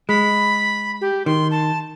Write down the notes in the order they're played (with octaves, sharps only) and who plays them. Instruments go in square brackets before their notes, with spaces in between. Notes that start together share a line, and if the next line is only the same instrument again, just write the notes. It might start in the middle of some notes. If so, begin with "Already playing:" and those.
[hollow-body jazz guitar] G#3 [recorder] B5
[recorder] G4
[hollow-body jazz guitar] D#3 [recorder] C6
[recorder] A5